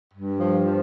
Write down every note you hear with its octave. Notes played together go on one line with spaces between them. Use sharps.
G2
F3
F3